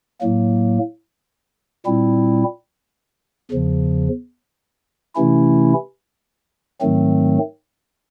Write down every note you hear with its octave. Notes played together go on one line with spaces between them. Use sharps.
A2 F#3 A#3
A#2 G3 C4 E4
E2 C#3 F3
C3 E3 A3 C#4 E4
G#2 D#3 F#3 A3 C4